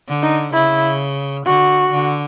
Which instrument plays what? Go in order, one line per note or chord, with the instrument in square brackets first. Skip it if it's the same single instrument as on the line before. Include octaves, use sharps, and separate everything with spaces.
[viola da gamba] D3
[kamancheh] D#4
[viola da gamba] C#3 [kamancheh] E4
[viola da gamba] D3 [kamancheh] F#4
[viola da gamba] D3